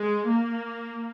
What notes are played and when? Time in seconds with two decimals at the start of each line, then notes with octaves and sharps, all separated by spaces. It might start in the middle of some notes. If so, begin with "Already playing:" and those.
Already playing: G#3
0.28 A#3